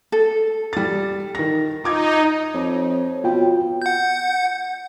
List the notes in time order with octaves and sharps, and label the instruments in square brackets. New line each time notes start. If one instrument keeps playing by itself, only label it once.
[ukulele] A4
[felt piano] G3 A6
D#3 A#6
[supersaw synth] D#4 [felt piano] F4 D6 G#6
[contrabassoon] F2 [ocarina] C#5
[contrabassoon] B2 [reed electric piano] F4 G5
[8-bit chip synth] F#5 G6